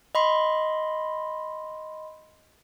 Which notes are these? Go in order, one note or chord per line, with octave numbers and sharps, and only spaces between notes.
D#5 B5 C6